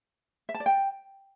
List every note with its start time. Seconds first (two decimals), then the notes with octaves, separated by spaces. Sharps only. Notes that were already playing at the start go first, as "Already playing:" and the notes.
0.49 E5
0.55 A5
0.60 D5
0.66 G5